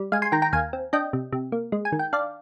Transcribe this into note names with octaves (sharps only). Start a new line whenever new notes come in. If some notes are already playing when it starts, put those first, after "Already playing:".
Already playing: G3
G#3 F5 G#5
G#5 C6
D#3 G5 A#5
G5 A#5
D#2 F5 G#5
C4
D4 D#5 G5
C3
C3
A#3
G#3
G#5
D#3
G5
D4 D5 F5